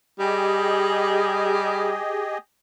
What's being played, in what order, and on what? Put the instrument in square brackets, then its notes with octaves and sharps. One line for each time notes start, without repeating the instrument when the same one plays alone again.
[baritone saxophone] G3 [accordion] G4 G#4 D#5